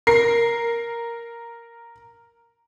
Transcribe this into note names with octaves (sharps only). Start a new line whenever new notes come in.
A#4 C7